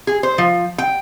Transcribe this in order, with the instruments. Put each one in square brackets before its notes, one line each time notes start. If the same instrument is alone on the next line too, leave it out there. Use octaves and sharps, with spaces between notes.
[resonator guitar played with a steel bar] G#4
C5
F3
G5